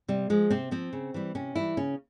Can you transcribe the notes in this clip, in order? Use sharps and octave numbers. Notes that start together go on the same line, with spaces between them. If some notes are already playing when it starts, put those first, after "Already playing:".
C3 G3
F3 G#3
C3 C4
F3 C4
C#3
E3 G3
C3 C#4
E3 G3 E4
C#3 C#4